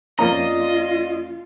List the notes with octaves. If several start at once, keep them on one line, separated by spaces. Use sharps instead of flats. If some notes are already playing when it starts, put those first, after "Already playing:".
F2 A#3 C#4 F4 D5 D#5 A#5